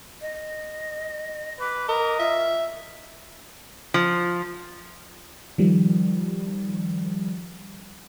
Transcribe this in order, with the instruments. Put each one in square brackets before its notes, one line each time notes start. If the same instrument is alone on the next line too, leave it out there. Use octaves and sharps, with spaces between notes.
[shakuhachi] D#5
[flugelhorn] B4 [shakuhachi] D6
[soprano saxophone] A#4 [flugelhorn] D#5
[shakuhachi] F4 [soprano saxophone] E5
[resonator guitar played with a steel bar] F3
[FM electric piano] D#3 F3 G3